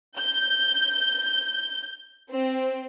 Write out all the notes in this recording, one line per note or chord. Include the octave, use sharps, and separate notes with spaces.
G6
C4